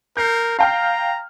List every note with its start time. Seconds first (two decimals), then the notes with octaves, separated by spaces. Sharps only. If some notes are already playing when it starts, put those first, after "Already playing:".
0.17 A#4 G6 C7
0.59 F5 G5 A#5 F6